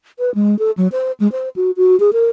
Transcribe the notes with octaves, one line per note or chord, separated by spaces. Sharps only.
B4
G#3
A4
F#3
C5
G#3
C5
F#4
F#4
G#4
A#4